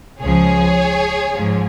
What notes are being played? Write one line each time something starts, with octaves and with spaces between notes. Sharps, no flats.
C#2 C#3 F3 G#4 C#5
G#2 F3